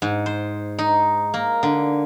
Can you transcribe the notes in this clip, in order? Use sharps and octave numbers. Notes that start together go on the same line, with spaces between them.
G#2
C5
D#4
A#3
D3